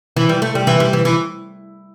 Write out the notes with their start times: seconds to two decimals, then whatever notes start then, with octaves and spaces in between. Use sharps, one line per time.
0.16 E3
0.29 G3
0.42 A3
0.55 G3
0.67 E3
0.80 G3
0.93 E3
1.05 E3